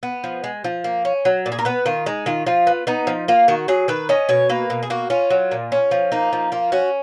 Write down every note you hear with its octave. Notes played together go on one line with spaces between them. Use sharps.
B3
F3
G#3
F3
A#3
C#4
F#3
A#2
G#4
A#4
B3 B4
D#3 F4
G#3 D#4
D#3 F4
F3 F4
B3
B3 D#4
F3
A#3 F4
D#3 F#4
F#3 G#4
D#3 B4
C#4 D#5
B2 C#5
A#3 B4
B2
G#4
A#3 F#4
C#4 F4
F#3
A#2
C#4
F3
A#3 D#4
F3
A#3 F4
C#4 F#4